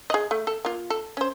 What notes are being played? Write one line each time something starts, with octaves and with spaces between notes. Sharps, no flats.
G#4 D#5
A3
A4
A#3 F4
A4
C#4 C5